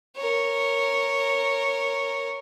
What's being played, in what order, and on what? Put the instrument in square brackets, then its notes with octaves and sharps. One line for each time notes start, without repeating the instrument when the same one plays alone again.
[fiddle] A#4 C#5